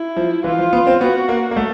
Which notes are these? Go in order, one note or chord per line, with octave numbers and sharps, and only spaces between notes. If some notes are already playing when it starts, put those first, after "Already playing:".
Already playing: E4
F3
E3 F4
F3
B3
C4
B3 F#4
A#3
A#3
A3